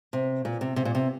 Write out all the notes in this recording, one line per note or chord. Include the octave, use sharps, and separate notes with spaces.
C3
A#2
C3
C3
A#2
C3